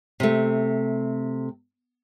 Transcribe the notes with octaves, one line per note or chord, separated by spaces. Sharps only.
C3 A3